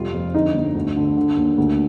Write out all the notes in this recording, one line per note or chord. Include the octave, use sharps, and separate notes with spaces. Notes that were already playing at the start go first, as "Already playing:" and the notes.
Already playing: F1 G3 F4
F2
D3 D#4
G1
D2
D3
D3
D#2
D2